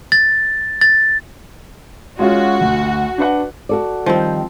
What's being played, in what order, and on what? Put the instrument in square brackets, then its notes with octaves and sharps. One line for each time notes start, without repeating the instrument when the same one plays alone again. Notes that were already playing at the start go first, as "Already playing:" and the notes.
[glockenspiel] A6
A6
[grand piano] G#3 C#4 F4 [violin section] F#4
[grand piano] D2
D4 B4 F#5
[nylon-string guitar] F#4 A4 D5
[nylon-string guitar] D#3 G3 [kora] F3 C4